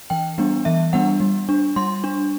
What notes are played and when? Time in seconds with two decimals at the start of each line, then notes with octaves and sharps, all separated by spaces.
0.10 E3 G5
0.38 G3 B3 D4
0.65 E3 E5
0.93 G3 B3 D4 F#5
1.20 G3
1.49 D4
1.76 G3 C6
2.04 D4